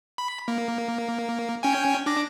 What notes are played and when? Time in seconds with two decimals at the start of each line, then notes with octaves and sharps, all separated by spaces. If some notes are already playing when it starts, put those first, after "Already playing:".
0.18 B5
0.48 A#3
1.63 C#4 G5 G#5
2.06 D4 D6 A#6